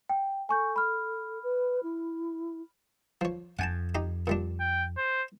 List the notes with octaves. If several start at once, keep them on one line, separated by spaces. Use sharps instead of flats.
G5
A4 G#5 C#6 G6
B5 F6
B4
E4
F3 C#5
F2 F#5 G#5 A5
D#4 G4 A#5
A#2 G3 D4
G5
C5